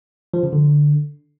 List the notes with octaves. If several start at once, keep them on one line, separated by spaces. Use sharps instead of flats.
F3
C#3
D3